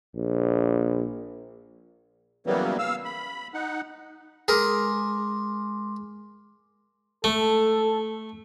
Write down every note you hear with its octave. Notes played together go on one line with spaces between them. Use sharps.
A#1
C#3 E3 F#3 G3 A#3 B3
F5 E6
B5
D#4 F#5
G#3 G#4 A#4 C6 D6
A3 A4